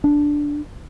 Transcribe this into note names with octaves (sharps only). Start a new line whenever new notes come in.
D4